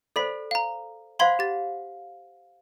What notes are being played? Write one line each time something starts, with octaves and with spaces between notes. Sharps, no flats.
A4 C5 D5 B5 B6
F5 A#5
C5 F5 F#5 B5 C6 G#6
G4 A6